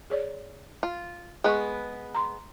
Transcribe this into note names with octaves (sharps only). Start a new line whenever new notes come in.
G#4 C#5 D5
F4
G#3 B3 G#4 B4 C#6
A#5 C6